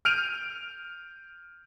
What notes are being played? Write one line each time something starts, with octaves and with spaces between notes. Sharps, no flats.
F6 G6 D7 D#7 F7